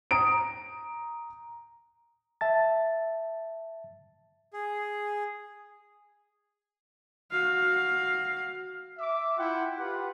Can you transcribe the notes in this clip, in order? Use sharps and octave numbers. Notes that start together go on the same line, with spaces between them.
A#5 D#6 D7
E5 A5 A6
G#4
F#4 F5
E5 D6
E4 F4 F#5 G5
F4 G4 B4 F#5